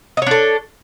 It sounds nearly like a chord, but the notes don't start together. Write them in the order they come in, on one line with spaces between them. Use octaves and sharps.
D#5 C#5 D4 A4